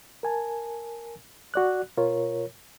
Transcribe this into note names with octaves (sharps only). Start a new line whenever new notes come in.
A#4 G#5 A5
F#4 D5 F#6
B2 F4 A#4 C#5